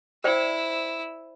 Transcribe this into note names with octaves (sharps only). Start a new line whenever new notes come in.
E4 C5 D5 G5 E6